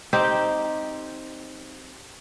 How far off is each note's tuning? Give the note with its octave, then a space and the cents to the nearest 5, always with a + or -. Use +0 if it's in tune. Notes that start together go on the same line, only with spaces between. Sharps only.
C4 +0 D#4 +0 G4 -5